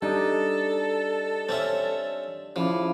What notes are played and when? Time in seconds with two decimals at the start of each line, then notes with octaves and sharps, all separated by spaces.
0.02 G3 D4 D#4 A4 D#5
1.49 C4 C#4 E5
2.56 C#3 F3 E4 D6